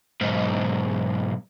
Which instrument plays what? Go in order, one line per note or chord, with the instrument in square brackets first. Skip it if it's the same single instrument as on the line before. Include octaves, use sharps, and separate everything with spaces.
[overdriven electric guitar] B1 G#2